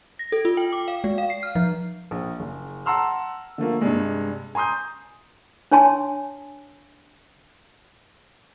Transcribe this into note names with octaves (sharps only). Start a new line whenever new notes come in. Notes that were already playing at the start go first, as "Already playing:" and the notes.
A#6
A4
F4
G5
D6
F5
G#3
F5
C7
F6
F3
A#1
F#1
F#5 A5 A#5 C6 E6 F6
D3 F3 A3 A#3
G2 C3 G3 G#3
G#5 A#5 C6 D#6 G6
D4 C#5 G#5 A5 C6